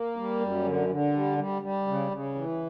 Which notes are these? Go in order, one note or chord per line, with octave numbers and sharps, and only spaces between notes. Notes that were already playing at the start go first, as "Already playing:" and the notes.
Already playing: A#3
G3
F#2
D3
D3
G3
G3
G3
C#3
C#3
E3